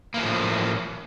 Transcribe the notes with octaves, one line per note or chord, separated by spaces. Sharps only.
A2 E3 F3 A#3